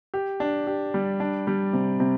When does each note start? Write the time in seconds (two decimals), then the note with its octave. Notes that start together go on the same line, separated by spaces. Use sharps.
0.14 G4
0.40 D4
0.67 G4
0.94 G3
1.20 D4
1.47 G3
1.73 C3
2.00 C3